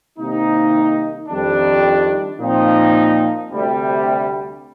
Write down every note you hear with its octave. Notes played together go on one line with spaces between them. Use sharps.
C2 C3 D#3 A#3 D#4
F2 D#3 G3 D4
A#2 F3 C4 D#4
D2 C3 G3